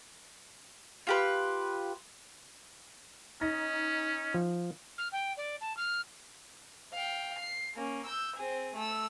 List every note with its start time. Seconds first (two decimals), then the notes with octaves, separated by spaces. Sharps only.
1.07 F4 G4 B4
3.41 C#4 D#4 A#6
4.34 F3
4.98 F6
5.12 G5
5.37 D5
5.61 A5
5.77 F6
6.93 F5 G5
7.39 C7
7.76 A#3 C#4
8.06 E6 G6
8.36 C4 G#4
8.75 A3 E6